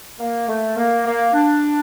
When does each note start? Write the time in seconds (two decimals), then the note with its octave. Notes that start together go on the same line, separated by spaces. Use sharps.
0.19 A#3
0.48 A3
0.77 A#3
1.05 A#3
1.33 D4